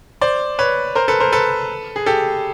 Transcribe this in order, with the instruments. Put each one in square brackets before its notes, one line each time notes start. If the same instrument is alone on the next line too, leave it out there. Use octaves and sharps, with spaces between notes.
[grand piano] C5 D5
B4 C#5
A#4 C5
A4 B4
A#4 C5
A4 B4
G#4
G4 A4